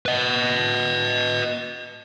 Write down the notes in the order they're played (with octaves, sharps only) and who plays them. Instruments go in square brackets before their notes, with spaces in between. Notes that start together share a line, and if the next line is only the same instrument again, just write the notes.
[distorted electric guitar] B4 D#5